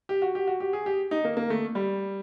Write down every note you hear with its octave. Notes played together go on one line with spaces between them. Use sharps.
G4
F#4
G4
F#4
G4
G#4
G4
D#4
A#3
A#3
A3
G3